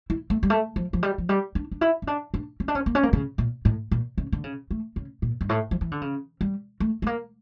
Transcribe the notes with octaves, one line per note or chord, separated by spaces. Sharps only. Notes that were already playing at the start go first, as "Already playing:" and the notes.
E4
A3
G3
A3
F3
F3
G3
F3
G3
D4
D4
E4
C#4
D4
D4
C#4
D4
C#4
A#3
C#4
A#3
C#3
A#2
A2
A#2
C#3
D3
C#3
A3
C#3
A#2
G2
A2
F3
E3
D3
C#3
G3
A3
A3
A#3